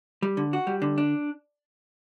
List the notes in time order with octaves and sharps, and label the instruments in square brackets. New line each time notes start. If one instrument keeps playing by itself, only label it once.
[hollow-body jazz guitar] G3
D3
F#4
G3
D3
D4